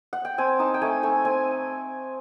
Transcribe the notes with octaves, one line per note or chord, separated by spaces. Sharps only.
F#5
G5
C4 G#5
D#4 A5
G5
A3 G#5
A3 G#5
C4 G#5